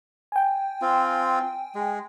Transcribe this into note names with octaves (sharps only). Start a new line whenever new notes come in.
G5 G#5
C4 F4
G#3